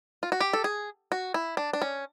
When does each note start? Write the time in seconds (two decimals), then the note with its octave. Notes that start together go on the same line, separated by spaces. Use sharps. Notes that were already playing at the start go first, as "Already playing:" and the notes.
0.23 F4
0.32 F#4
0.41 G4
0.53 A4
0.64 G#4
1.12 F#4
1.34 E4
1.57 D4
1.73 D4
1.82 C#4